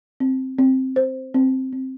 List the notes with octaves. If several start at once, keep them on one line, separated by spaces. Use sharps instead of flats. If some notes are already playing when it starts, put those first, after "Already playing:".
C4
C4
C5
C4
C4